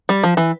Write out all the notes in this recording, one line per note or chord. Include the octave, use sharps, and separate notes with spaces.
G3
F3
E3